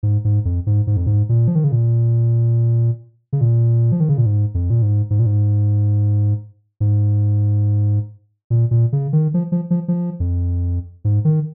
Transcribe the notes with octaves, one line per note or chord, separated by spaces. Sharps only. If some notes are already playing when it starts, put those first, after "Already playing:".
G#2
G#2
F2
G#2
G#2
F2
G#2
A#2
F3
D#3
C#3
A#2
C#3
A#2
F3
D#3
C#3
A#2
G#2
F2
A#2
G#2
G#2
A#2
G#2
G#2
A#2
A#2
C#3
D#3
F3
F3
F3
F3
F2
G#2
D#3